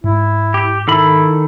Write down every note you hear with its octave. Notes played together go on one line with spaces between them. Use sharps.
G#2 E4
G4
D#3 E4 A4 B5